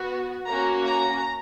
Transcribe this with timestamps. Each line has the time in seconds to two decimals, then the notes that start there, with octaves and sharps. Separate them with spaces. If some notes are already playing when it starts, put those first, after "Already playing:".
Already playing: B3 F#4
0.47 A#3 C#4 F#4 A#5
0.87 A#5